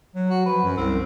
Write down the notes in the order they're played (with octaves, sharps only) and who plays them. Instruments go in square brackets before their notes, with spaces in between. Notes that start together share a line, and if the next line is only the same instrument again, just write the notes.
[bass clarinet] F#3
[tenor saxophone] F#4
[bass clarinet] F3 [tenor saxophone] B4
[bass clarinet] F#2
[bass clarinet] C2 [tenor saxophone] C4